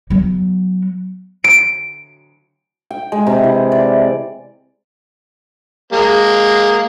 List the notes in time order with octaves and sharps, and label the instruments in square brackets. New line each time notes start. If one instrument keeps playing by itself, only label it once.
[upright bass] F#3 B3
[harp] D7
[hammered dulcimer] G5
G#3
C3
E3
D5
[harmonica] G#3 A#3